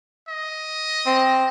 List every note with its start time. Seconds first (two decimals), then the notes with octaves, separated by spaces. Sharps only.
0.29 D#5
1.06 C4